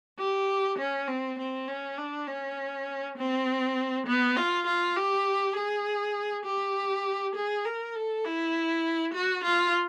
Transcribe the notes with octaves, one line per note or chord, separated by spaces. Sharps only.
G4
C#4
C4
C4
C#4
D4
C#4
C4
B3
F4
F4
G4
G#4
G4
G#4
A#4
A4
E4
F#4
F4